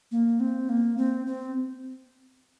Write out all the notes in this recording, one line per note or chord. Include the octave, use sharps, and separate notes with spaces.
A#3
C4
A#3
C4
C4